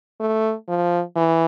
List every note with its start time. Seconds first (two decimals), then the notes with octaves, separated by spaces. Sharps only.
0.20 A3
0.69 F3
1.16 E3